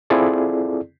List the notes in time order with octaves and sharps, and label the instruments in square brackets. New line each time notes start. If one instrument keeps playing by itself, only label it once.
[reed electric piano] C4 E4 F4 G#4 A4 D5